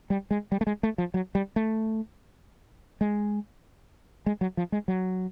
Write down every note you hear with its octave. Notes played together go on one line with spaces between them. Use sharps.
G3
G#3
G3
A3
G#3
A3
F3
F#3
G3
A3
G#3
G#3
F#3
F3
G#3
F#3